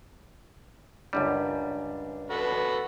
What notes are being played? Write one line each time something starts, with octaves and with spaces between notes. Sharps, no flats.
C#2 F#2 G3 D4
F#4 A4 B4